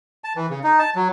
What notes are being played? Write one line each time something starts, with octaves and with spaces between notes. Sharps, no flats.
A5
E3
C#3
D#4
A5
F#3